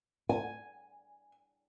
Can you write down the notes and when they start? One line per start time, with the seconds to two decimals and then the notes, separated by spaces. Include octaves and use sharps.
0.29 G#5